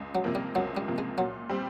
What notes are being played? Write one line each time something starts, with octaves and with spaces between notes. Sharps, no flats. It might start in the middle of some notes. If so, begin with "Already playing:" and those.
Already playing: C#2
F#3
C3 F3 A#3
G3
C#2 F#3
G3
C3 F3 A#3
G#3
A#2 F#3
G3 C4